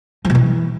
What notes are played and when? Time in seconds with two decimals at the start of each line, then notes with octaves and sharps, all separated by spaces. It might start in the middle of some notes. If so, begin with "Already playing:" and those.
0.25 F3
0.30 B2
0.35 E3